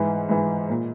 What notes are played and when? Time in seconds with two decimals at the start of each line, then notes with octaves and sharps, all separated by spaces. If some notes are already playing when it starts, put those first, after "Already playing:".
Already playing: G#2 E3
0.29 G#2 E3
0.70 A#2